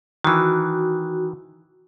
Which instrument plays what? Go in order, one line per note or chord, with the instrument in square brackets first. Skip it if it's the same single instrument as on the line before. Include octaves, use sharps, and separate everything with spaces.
[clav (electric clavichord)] D#3 E3 [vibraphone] F#4